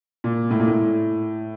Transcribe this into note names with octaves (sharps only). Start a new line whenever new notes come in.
A#2
A2
A#2
A2